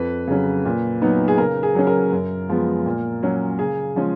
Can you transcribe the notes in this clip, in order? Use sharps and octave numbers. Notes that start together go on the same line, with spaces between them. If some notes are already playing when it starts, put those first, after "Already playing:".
Already playing: F2 B4
C#3 F#3 C#4
A#2
F#3 B3 D#4
G#4
C#3 A#4
G#4
F#3 C#4
A#4
F#2
F3 G#3 B3
A#2
F#3 C#4
C#3 G#4
F3 G#3 C#4